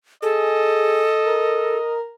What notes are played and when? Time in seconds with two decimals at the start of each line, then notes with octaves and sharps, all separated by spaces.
0.22 G#4 A4 D#5
1.25 A#4